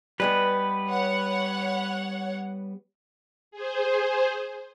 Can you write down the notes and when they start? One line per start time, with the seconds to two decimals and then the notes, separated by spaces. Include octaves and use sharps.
0.20 G3 G#3 B3 B4
0.87 C#5 F#5
3.51 G#4 C5